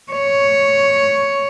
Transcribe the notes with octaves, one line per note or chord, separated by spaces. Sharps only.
C#5